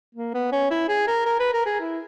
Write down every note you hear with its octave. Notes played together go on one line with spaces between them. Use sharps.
A#3
B3
C#4
E4
G#4
A#4
A#4
B4
A#4
G#4
E4